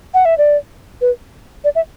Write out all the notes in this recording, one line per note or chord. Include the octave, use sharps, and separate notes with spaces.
F#5
E5
D5
B4
D5
E5